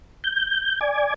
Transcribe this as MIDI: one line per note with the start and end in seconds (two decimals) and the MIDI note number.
0.24 0.79 91
0.81 1.14 74
0.81 1.14 80